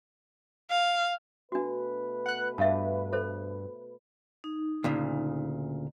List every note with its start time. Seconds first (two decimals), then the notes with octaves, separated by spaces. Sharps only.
0.70 F5
1.52 B2 A3 D4 F#4 B4
2.26 F#5 F#6
2.58 G2 E5 F5 A5
3.13 A4 C5
4.44 D#4
4.84 D2 A#2 C#3